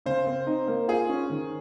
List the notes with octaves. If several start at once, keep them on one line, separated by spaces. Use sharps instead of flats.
C#3 C5
C4
D#4
A#3
F4 G#4
C#4
D#3